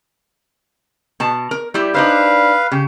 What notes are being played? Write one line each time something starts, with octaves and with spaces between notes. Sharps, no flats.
B2 A5
A#4
G3 E4 G4
D4 D#4 B4 C5 F5
C#3 G4